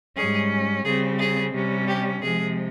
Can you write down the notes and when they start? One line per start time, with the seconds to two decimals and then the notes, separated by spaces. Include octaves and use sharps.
0.16 G#2 G3 C#4 G#4
0.85 C#3 G3 C4 G#4
1.19 G#4
1.53 C3 G3 C#4
1.88 G4
2.22 C3 F3 G#3 G#4